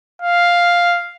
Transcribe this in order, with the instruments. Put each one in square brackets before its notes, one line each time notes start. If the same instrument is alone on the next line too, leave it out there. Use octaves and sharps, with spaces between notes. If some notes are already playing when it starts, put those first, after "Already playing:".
[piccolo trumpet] F5